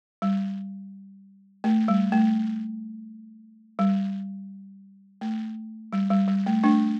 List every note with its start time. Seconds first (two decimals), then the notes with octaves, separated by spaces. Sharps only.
0.22 G3
1.64 A3
1.88 G3
2.12 A3
3.79 G3
5.21 A3
5.93 G3
6.11 G3
6.28 G3
6.46 A3
6.64 A3 D4